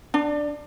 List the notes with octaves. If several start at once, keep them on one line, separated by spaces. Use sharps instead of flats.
D4